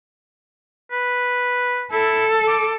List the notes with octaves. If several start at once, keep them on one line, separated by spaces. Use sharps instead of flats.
B4
E4 A4
D6